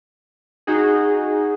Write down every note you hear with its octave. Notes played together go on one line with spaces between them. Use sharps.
D#4 F#4 G#4